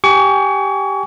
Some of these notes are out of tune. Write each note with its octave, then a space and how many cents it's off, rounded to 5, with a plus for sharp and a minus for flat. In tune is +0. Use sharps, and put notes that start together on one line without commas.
G4 +0 G#5 +0 C#6 +35